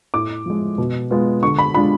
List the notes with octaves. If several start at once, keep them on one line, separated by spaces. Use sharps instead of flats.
A2 D6
F3 G#3
B2
G#3 B3 F4
D3 C#6
B5
G#3 D4 F4 B5